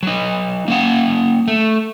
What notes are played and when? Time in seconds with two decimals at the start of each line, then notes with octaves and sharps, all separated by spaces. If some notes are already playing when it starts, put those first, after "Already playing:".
0.03 F#3 D#4
0.68 A#3 C#4 F#5
1.48 A3